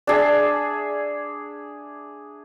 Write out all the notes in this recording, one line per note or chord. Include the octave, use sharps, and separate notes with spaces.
D4 G#4 E5